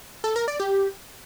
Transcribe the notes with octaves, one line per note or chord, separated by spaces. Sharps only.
A4
A#4
D5
G4